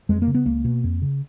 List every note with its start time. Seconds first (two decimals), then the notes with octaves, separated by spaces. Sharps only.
0.09 F2 G#3
0.22 A#3
0.27 C#3
0.35 B3
0.46 C#2 A#3
0.64 B2
0.84 F2
1.02 C#3